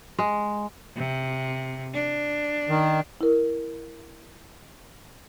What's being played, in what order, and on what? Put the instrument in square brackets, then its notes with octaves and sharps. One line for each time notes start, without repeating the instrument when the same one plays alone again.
[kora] G#3
[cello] C3
D4
[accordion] D#3
[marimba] E4 A#4